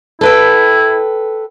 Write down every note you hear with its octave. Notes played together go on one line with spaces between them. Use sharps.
E4 A4 B4 G5